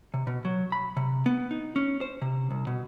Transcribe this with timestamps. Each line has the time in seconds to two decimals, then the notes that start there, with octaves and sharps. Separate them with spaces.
0.14 C3
0.27 B2
0.45 F#3
0.72 B5
0.97 C3
1.26 B3
1.51 D#4
1.76 C#4
2.01 C5
2.22 C3
2.51 C2
2.67 B2